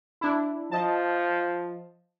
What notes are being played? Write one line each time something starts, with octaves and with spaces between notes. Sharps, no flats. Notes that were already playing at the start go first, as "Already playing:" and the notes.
D4 E4
F3 D#5 A5